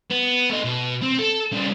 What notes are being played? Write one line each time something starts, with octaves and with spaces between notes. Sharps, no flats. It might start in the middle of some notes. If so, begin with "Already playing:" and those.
B3
A3 D#5
B2
C4
A4
C#3 G3